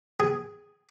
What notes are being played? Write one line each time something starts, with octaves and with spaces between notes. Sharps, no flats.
G#4